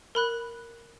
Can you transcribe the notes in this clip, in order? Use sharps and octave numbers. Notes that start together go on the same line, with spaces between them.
A#4 B5 F#6